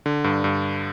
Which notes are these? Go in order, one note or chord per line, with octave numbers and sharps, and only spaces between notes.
D3
G2
G2